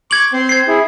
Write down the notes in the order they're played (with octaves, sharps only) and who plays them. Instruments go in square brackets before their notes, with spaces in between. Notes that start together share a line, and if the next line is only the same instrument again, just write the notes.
[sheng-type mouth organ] C#6 D6 [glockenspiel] G#6 F#7
[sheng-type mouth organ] C4 C5 C6
[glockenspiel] G#6 C7
[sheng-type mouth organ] E4 G#4